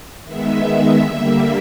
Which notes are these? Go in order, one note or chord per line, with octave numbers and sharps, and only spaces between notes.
D#3 G#3 B3 E5
D3 G3 A#3